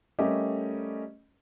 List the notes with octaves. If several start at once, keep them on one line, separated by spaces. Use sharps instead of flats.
G3 A3 C#4 G4 A#4 D#5